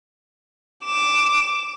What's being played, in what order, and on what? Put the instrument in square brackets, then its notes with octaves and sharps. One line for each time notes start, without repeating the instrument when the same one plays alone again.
[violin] D6 E7